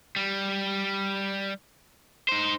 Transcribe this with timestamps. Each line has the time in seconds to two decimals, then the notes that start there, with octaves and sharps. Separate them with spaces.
0.16 G3
2.29 D#4 C5